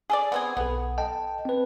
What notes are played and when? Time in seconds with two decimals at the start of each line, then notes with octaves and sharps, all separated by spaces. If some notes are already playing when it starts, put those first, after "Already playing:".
0.10 G#4 A4 D5
0.32 B3 C4 G#4
0.57 B1 B3 A4
0.98 D#5 G5 A5
1.45 C4 B4